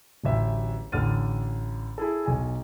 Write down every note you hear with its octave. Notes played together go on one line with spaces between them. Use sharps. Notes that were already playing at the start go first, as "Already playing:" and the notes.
D1 A1 E5
A1 D3 F6 A6 D#7
E4 G#4 A4
B1 G#5